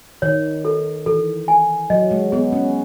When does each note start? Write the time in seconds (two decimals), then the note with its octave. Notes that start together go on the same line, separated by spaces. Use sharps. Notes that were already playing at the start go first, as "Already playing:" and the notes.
0.22 D#3 C#5
0.65 A4
1.06 E3 A4
1.48 G#5
1.90 F#3 D#5
2.11 G#3
2.32 B3 G#4
2.52 C#4